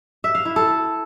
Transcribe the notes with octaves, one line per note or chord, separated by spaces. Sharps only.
E5
F5
E4
A4